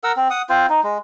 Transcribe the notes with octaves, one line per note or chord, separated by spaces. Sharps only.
A#4 F#5 E6
C4
F#5 D#6
C4 F4 C5
D#4
G#3